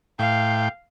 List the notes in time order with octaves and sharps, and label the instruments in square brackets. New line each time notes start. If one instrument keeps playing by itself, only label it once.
[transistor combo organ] A2 G5 [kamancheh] F5